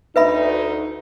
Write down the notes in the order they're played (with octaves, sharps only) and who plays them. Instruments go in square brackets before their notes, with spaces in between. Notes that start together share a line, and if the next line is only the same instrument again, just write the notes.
[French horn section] D2 D#4 [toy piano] B4 E5 B5